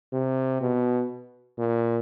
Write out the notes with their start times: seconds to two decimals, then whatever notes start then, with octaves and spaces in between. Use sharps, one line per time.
0.13 C3
0.61 B2
1.58 A#2